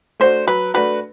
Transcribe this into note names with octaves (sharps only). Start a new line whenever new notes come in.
A3 D4 F#4 C5
F#3 B4
A3 D4 F#4 B4